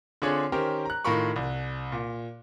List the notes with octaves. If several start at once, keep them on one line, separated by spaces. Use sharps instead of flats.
D3 C4 D4 F4 G#4 C#5
D#3 C#4 G4 A#4 C5
A#5 F#6
A2 D#3 F4 A#4 B5 C#6
C2
A#2